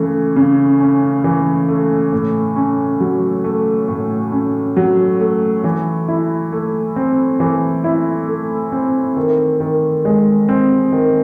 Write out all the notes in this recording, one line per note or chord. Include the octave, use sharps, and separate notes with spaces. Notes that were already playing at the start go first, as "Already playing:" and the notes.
Already playing: C#3 E3 A3
C#3
C#4
E3
A3
A2
C#4
F#3
A3
A2
C#4
F#3
A3
E3
E4
A3
C4
E3
E4
A3
C4
D#3
D#3
G#3
C4
D#3